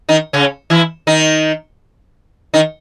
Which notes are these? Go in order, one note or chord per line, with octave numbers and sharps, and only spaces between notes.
D#3 D#4
C#3 C#4
E3 E4
D#3 D#4
D#3 D#4